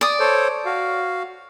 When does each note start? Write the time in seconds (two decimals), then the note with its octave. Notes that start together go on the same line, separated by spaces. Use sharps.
0.01 D5 D#6
0.20 A4 C5 C#5
0.66 F#4 F5